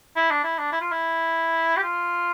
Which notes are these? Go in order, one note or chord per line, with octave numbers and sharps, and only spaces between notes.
E4
D4
E4
D4
E4
F4
E4
G4
F4